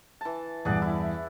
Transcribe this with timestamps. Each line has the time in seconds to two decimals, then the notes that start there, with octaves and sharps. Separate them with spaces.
0.21 E3 A5
0.65 E2 G2 G#4 D5 F#5
0.82 E4